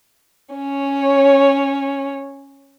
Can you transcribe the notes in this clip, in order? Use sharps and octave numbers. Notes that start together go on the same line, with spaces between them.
C#4 C#5